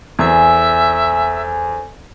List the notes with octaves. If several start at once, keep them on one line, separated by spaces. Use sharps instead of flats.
E2 A4 C5 E5 G#5